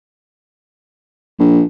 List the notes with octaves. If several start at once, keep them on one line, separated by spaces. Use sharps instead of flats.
A#1